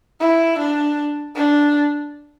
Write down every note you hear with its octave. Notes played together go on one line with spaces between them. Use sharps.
E4
D4
D4